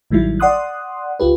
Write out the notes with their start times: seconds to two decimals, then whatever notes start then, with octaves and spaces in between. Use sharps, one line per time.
0.11 A1 D#3 F#3 G3 E4
0.40 D5 F#5 C6 D#6 F#6
1.20 C#2 F4 G4 B4